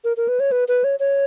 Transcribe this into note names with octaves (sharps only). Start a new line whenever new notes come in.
A#4
A#4
B4
C#5
B4
B4
C#5
C#5